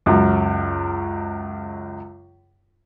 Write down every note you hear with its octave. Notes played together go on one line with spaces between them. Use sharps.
C#2 F#2